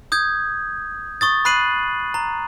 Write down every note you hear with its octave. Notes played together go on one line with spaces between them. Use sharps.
D#6 G6 G#6
C#6 D#6 A6
B5 F#6 C7 D#7 F#7
A#5